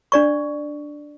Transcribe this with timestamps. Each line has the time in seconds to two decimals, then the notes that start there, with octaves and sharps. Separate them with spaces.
0.12 D4 D5 C#6